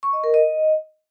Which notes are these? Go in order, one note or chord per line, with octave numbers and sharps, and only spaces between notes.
C#6
D#5
A#4
D#5